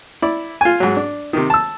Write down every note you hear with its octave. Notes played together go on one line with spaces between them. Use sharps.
E4 D5
F4 G#5
G#2 F#3
D4
C3 D#3
A5 E6